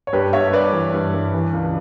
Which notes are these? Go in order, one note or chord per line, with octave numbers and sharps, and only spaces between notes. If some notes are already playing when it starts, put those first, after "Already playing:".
C#5
G2 G4 B4
G2 C#5 E5
G2 B4 D5
E3
G2
G2
E3
C#2